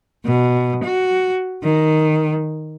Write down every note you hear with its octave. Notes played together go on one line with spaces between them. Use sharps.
B2
F#4
D#3